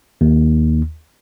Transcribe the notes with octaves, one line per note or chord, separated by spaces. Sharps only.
D#2